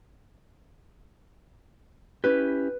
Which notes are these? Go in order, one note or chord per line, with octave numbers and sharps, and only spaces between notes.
C#4 E4 G4 B4